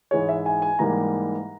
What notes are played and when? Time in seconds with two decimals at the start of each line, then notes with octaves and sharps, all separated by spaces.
0.11 G#2 E3 G#3 C#5
0.29 E5
0.46 G#5
0.62 G#5
0.79 G#2 E3 G3 A#3 A#5